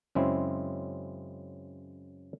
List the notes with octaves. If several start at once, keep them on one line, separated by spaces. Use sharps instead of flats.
F#2 C#3 G#3 C4 E4